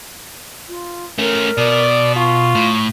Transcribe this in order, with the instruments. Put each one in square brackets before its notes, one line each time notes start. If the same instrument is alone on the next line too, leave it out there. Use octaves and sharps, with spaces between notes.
[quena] F4
[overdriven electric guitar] A3 C#4 [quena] A#4
[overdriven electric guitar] B2 [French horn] D5
[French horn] F4 [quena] C#6
[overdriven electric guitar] A2